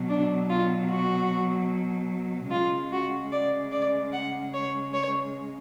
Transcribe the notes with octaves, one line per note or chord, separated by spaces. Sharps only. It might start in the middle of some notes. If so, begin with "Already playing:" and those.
Already playing: B2 F#3
D4
F4
F#4
C#3 G#3 F4
F#4
D5
D5
F#5
C#5
C#5